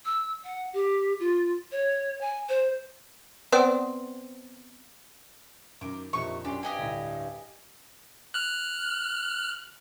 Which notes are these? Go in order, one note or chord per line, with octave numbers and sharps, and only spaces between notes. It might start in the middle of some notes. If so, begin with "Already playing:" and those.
E6
F#5
G4
F4
C#5
G#5
C5
B3 C4 D5
F#2 D#3 D6
A#1 F2 C3 D#3 C#6
F#2 C#4 D4 G4 C6
G2 G4 D#5 G5 G#5
D2 A2
F6 F#6